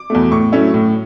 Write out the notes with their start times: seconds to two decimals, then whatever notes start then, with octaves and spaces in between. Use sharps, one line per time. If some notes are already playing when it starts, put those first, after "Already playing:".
Already playing: D6
0.10 E2 B2 A3
0.31 A2 C#6
0.52 F#3 A3 C#4 E4
0.74 A2